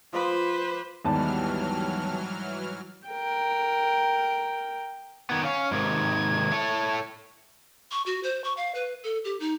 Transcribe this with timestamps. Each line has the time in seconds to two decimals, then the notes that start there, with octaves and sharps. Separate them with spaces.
0.13 F3 B4 C5 F5 D6
1.05 D#2 G#2 E3 F#3 G3 B3 A5 F6
3.09 A#4 G5
5.30 D#3 B3 G#6
5.44 C#4 F5
5.71 G#2 C3 D#3 G#6
6.52 E4 A4 C#5
7.92 C#6
8.06 F#4
8.23 C5
8.44 C#6
8.57 F5
8.75 B4
9.04 A4
9.25 G4
9.40 D#4